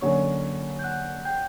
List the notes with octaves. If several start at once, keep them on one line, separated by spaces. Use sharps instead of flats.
D3 F#3 A#3 C#4 F#4 C#5 C#6
G6
F#5 F#6
G5 G6